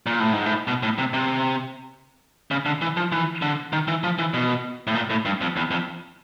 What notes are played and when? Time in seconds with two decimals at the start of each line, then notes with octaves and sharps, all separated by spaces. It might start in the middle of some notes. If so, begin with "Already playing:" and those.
0.06 A#2
0.20 A2
0.33 G#2
0.46 A2
0.68 B2
0.83 A2
0.98 C3
1.14 C3
2.51 C#3
2.66 D3
2.82 E3
2.97 F3
3.12 E3
3.42 D3
3.73 D#3
3.88 E3
4.04 F3
4.19 E3
4.34 B2
4.87 A2
4.95 A#2
5.10 A2
5.25 G2
5.41 F2
5.57 E2
5.71 F2